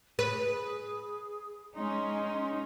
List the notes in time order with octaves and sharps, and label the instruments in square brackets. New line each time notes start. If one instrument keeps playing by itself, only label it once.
[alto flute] G#4 [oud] B4
[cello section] G#3 C#4 D#4 [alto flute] C6